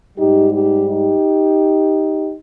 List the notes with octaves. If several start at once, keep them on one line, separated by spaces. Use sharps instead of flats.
G#2 G3 D#4 G4
D#4 G4
D#4 G4